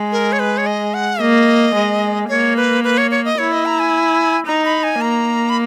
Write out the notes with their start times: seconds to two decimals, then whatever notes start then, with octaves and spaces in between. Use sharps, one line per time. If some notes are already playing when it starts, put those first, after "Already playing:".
Already playing: G#3
0.12 A#4
0.32 C#5
0.39 B4
0.58 C#5
0.66 D#5
0.94 F#5
1.21 A#3 D#5
1.75 G#3
2.29 A#3 C#5
2.57 B4
2.84 B4
2.98 C#5
3.11 C#5
3.25 D#5
3.38 E4 C#5
3.52 D#5
3.66 A#5
3.79 G#5
4.47 D#4 A#5
4.65 B5
4.83 G#5
5.01 A#3 A#5
5.50 B5